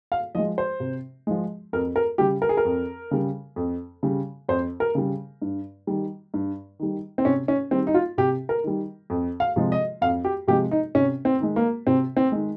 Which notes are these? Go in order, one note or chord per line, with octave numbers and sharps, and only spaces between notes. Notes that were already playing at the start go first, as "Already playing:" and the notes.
F5
F3 G#3 D#5
C5
C3
F3 G#3
F2 A#4
A#4
C#3 G3 G4
A#4
G#4
A#4
F2
C#3 G3
F2
C#3 G3
F2 C5
A#4
C#3 G3
G2
D#3 G3
G2
D#3 G3
C4
C3 C#4
C#4
D#3 G3 C4
D#4
F4
C3 G4
A#4
D#3 G3
F2
F5
C3 F3 G#3
D#5
F2 F5
G4
C3 F3 G#3 G4
D#4
C3 C#4
C4
D#3 G#3
A#3
C3 C4
C4
D#3 G#3